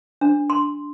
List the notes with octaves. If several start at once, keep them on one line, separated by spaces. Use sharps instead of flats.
D4
C6